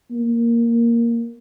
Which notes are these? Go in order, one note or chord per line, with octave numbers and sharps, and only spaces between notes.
A#3